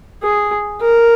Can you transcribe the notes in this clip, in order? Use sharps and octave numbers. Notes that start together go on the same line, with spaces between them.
G#4
A#4